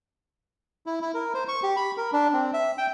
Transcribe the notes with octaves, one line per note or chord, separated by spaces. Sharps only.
E4
E4
A#4
C5
C#6
G4
B5
A#4
D4
C4
E5
G5